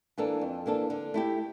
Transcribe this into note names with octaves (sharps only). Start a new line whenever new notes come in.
E3 A#3 D4 A4
F2
E3 A#3 D4 A4
D3
A3 E4 G4